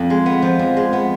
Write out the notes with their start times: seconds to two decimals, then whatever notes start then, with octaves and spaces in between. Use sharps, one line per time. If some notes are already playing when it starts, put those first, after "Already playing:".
Already playing: F2
0.10 G#3
0.26 B3
0.42 F3
0.59 F2
0.77 G#3
0.93 B3